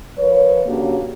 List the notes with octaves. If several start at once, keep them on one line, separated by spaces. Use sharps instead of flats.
F3 A#4 B4 C#5
C#3 F#3 A#3 D4 F#4 G4